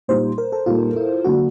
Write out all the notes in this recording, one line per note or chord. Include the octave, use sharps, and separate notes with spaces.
A#2 G3 A#3 D#4 C5
A#4
A4
A#2 G3 A#3 D#4 F4
E4
D3 F#3 A#3 D4 F#4